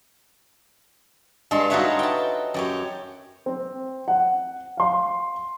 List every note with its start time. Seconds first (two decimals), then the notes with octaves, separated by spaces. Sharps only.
1.51 G2 G#3 A4 C6
1.70 D#4 F4 F#4 B4 C#5 E5
1.99 G5 A5
2.54 F#2 G4 C#5
3.46 C4
4.08 F#5
4.77 F5 C6